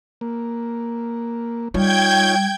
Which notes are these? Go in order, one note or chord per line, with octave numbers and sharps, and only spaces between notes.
A#3
G3 D#4 F4 C#5 G5 G6 G#6